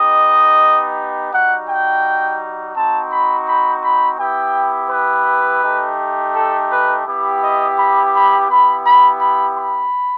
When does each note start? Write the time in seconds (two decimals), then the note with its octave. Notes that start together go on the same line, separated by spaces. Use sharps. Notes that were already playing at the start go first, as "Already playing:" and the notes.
Already playing: B3 D#4 G4 D#5
1.32 G3 D#4 F#4 F#5
1.68 G5
2.75 C4 D#4 F#4 A5
3.11 B5
3.47 B5
3.83 B5
4.19 B3 E4 G4 G5
4.90 B4
5.63 A3 D#4 G4
6.34 A4
6.70 B4
7.06 B3 E4 G4
7.42 D#5
7.78 B5
8.14 B5
8.49 B3 E4 G4 B5
8.85 B5
9.20 B5
9.56 B5